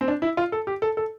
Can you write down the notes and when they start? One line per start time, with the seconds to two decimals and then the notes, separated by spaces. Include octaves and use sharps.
0.01 C4
0.08 D4
0.22 E4
0.37 F4
0.52 A4
0.67 G4
0.82 A4
0.97 A4